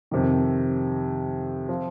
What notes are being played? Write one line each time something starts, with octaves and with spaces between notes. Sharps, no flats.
F2 C3 D#3
F3 C4 F4